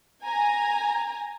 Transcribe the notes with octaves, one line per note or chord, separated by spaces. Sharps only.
G#5 A#5